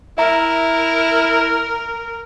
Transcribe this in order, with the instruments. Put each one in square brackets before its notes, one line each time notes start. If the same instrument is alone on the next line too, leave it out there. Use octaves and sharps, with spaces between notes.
[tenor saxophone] E4 [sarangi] A#4 [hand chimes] E5 A#5